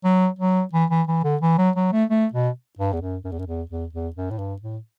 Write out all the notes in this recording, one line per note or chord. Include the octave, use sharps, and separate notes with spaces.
F#3
F#3
E3
E3
E3
D3
E3
F#3
F#3
A3
A3
B2
G2
E2
F#2
F#2
E2
F#2
E2
E2
E2
F#2
A2
G2
A2